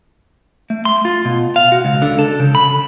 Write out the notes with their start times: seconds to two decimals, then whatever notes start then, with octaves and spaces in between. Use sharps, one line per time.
0.70 A3
0.85 C6
1.05 F4
1.25 B2
1.56 F5
1.72 F#4
1.85 C#2
2.02 D3
2.19 A4
2.40 C#3
2.55 B5